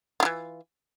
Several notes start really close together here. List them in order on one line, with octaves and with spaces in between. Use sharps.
F4 E4 E3